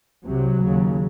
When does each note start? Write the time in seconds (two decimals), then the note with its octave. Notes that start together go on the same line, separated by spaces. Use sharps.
0.26 C2 C3 F#3
0.63 D#2 C#3